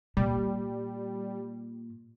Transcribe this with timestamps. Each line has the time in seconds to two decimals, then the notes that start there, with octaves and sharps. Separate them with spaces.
0.17 A#2 G3